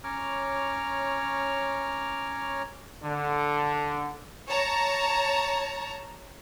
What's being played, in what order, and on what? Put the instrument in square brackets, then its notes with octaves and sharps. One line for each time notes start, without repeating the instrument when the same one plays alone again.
[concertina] C#4 C#5 A#5 D6 F6
[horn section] D3
[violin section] C#5 A5 A#5